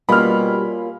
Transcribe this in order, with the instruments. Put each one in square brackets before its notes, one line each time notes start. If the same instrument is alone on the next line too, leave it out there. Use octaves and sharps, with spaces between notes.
[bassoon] B2 [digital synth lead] G3 [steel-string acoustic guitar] A#3 C#4 F4 [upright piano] B5 F6